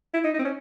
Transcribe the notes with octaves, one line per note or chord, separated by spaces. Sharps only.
E4
D#4
D#4
C4
C#4